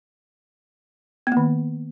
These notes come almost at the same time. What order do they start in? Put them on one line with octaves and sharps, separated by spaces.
B3 A#3 D#3